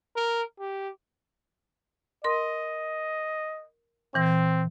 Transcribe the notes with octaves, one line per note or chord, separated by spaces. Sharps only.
A#4
G4
A#4 D#5 C6
A#2 E3 C4 A#6